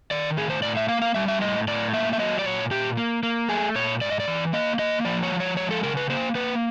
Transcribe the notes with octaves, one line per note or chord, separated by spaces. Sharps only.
D#3 D5
A2 G#4
C5
A2 D5
E5
A#3 F5
F5
G3 E5
E5
A2 D#5
A2 D5
A#3 E5
E5
F#3 D#5
D5
A#2 C#5
A#2 G4
A#3
A#3
A3 G#4
A#2 C#5
G#2 D5
D#5
D5
E3
A#3 D#5
A#3 D#5
F3 D5
C#5
F3
C#5
G#3 C#5
A4
C#3 A#4
B4
A#3 C5
A#3 B4